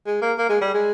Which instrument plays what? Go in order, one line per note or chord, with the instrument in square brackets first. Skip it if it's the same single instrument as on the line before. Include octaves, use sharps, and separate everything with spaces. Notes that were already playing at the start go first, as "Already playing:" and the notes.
[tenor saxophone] G#3
A#3
A#3
G#3
G3
G#3